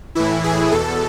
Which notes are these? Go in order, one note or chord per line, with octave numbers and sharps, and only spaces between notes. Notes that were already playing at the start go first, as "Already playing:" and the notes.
A2 E3 E4
G#4
E2 B2 A4